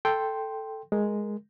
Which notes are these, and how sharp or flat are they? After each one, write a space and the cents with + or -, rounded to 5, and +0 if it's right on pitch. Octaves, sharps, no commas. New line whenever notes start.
A4 +0 G5 +0 C6 +0
G#3 +0 A#4 +0